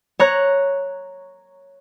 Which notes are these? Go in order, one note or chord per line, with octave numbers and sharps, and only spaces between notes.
C#5 A#5 F#6